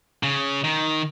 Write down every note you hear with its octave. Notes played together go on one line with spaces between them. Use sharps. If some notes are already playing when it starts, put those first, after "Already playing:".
C#3
D#3